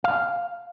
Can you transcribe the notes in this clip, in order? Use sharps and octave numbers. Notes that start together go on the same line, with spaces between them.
F5